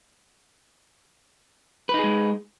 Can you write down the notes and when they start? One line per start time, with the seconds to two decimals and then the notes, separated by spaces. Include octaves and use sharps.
1.89 B4
1.94 D#4
1.99 G#4
2.04 G#3